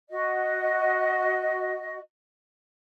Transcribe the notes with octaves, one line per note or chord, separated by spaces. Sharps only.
F#4 D#5